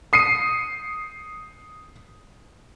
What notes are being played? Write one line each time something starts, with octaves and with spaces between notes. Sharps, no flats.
D#6 C7 C#7 D#7